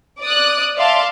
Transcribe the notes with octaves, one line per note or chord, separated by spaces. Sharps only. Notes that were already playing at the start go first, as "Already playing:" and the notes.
D5 D#6 F#6
D5 E5 F5 A5 C6